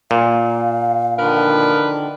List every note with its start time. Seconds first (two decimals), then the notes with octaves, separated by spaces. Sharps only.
0.11 A#2 F5
1.19 D3 D#3 F3 D4 A#4 B4